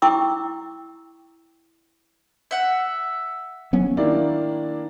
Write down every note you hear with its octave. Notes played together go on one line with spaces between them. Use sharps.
E4 G5 C#6 D6 E6
E5 F#5
F#3 B3 C#4
D#3 A#3 D4 E4 D5